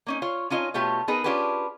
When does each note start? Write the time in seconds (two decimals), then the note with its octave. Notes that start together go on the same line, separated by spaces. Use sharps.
0.07 A#3 C#4 D#4
0.22 F4 C#5
0.50 C#4 D#4 F4 C#5 D#5
0.74 B2 A3 F4 G4 C#5
1.08 B3 D#4 G#4 A#4 B4
1.24 C#4 D4 F4 G4 G#4 B4